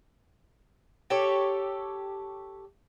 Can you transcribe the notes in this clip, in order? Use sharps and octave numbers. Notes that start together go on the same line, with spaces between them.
G4 A4 C#5